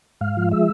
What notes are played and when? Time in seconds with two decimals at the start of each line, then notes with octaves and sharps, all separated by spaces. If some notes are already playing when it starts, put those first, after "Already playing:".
0.21 G#2 F5
0.37 F3
0.51 G#3 E5